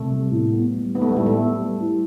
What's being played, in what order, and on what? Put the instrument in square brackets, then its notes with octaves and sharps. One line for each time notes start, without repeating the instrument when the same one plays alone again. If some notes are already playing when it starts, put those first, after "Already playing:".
Already playing: [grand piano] C3 [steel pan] A3
[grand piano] G3
A2
B3
G3
[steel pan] B3 [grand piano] D#4
[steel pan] A3
G3
[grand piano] A2 [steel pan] A3
[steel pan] A3
[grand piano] B3
G3
E4